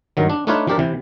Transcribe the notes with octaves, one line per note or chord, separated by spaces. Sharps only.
G2 D#3 F#3
D4
A3 D4 D#4 F4 B4 C#5
F3 D4 G4 A#4 D5
C3 E3